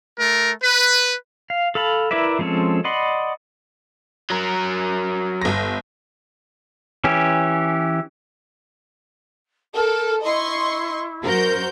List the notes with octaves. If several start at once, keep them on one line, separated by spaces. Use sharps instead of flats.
A3 A#4
B4
F5
A4 F5 A5 B5
E4 A#4 B4 D5 E5
F3 G#3 C4 C#4 A4
D5 D#5 F#5 B5 C6
F#3 A#4
G1 A#6
E3 C#4 G4
A4 A#4
E4 D#5 C6 C#6
F#2 F#4 A#4 C5 G6